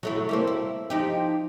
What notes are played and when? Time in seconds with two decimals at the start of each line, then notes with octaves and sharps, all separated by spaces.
0.03 F#3 A3 E4
0.29 G3 A#3 C4
0.47 E4
0.90 F3 D#4 G4